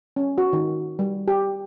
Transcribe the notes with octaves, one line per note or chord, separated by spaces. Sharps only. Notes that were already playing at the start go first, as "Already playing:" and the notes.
C#4
F#4
D#3
G3
G4